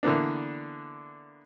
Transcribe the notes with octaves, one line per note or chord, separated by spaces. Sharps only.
D3 E3 A#3 B3 D4